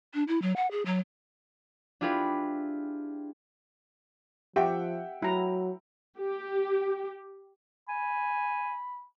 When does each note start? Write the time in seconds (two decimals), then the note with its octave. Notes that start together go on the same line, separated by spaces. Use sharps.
0.14 D4
0.28 E4
0.42 F#3
0.56 F#5
0.71 G#4
0.86 F#3
2.01 D4 E4 F4 G4 G#4 B4
4.56 F3 G4 E5 F#5 G5
5.22 F#3 E4 A#5
6.18 G4
7.88 G#5 B5